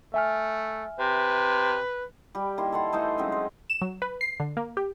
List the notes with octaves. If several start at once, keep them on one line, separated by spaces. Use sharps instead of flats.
A3 E5 G#5 F6
C3 B4
G3 G4
D#3 A#3 E4 C6
A4 C#5 F#5 C6
E3 A3 D#4 C5
F#3 G#3 C4 C#4
C5
E7
F#3
B4
C7
D3
A#3
G4